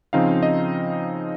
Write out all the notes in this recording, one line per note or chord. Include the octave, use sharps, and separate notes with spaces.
C#3 F3 C4 D#4 F5
D#5